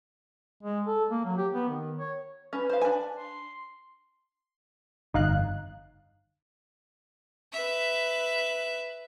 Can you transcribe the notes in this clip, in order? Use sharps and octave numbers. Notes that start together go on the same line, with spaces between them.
G#3
A4
A#3
F#3
G4
B3
D#3
C#5
C#4 B4
C5 F5
D4 G#5
C6
G1 F2 D#4 F5 F#6
B4 E5